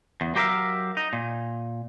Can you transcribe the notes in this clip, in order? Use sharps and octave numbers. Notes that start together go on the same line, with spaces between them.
E2
F#3 G4 A#4 B4 E5 F5
D#4
A#2